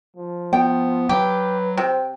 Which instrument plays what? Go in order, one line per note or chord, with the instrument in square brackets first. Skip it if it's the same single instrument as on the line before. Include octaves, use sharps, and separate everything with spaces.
[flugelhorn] F3
[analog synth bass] B3 [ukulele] G5
[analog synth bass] F#3 [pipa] G4 [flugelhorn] B4
[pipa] C3 [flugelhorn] C5 [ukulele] G5